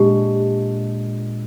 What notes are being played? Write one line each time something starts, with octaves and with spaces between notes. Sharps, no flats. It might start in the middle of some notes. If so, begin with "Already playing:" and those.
Already playing: A#2 G#3 D4 G4